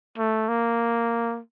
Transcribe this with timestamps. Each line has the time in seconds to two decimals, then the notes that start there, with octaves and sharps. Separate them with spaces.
0.18 A3
0.49 A#3